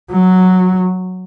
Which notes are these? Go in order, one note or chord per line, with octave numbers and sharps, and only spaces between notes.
F#3